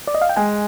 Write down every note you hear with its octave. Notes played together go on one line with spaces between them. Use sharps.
D5
D#5
F5
G5
G#3 G#5